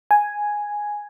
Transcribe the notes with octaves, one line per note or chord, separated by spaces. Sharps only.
G#5